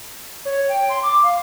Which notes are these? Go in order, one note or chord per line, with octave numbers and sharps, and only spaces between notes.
C#5
G5
C6
D6
F5